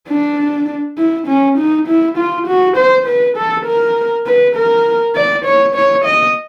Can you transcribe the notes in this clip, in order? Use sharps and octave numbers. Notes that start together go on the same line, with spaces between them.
D4
E4
C#4
D#4
E4
F4
F#4
C5
B4
A4
A#4
B4
A#4
D5
C#5
C#5
D#5